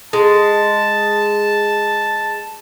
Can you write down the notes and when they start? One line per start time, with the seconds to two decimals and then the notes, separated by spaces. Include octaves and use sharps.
0.13 G#3 A5